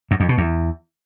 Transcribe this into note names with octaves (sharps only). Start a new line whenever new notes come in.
F#2
F2
B2
E2